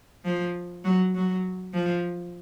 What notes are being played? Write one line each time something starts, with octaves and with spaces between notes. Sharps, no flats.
F3
F#3
F#3
F3